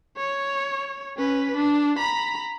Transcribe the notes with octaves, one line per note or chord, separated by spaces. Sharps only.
C#5
C#4 B4
D4
A#5 B5